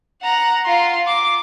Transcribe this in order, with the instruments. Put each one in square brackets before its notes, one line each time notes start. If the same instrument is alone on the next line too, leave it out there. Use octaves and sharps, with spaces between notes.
[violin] F#5 A#5
F4 C6
D6